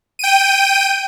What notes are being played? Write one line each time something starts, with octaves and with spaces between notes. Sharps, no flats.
G5 D#7